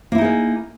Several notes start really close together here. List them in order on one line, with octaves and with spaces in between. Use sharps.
A#3 E4 D#4 G#4 A#4